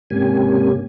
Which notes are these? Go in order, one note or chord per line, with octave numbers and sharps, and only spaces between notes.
G#2 C3 A#3 C#4 G4 G#5